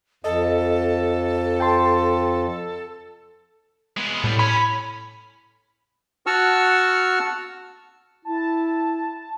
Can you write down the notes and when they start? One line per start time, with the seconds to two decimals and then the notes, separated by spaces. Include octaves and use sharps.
0.24 F2 A4 D#5
1.60 G5 A5 C6
3.97 G#3 B3
4.24 A2 G3 B3
4.39 C#4 B5
6.26 F#4 F#5 A5 C#6 E6 F6
8.25 E4 A5